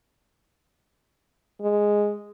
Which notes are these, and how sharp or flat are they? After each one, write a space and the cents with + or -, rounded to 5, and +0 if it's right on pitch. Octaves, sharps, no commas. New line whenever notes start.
G#3 -5